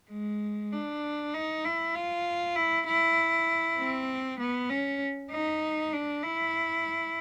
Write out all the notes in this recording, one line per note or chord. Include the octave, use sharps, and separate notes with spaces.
G#3
D4
D#4
E4
F4
E4
E4
C4
B3
C#4
D#4
D4
E4